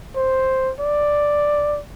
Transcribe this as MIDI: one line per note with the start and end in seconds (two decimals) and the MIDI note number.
0.16 0.72 72
0.80 1.80 74